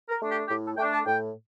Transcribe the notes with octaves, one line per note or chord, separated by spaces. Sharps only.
A#4
A3 D4
G4
A2 G4
A4
A3 D4 G5
A5
A2 G5